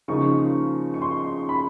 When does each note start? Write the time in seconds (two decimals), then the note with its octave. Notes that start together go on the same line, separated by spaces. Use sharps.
0.08 C#3 F3 A#3 D#4 C#6
0.94 C#6
1.02 C6
1.49 B5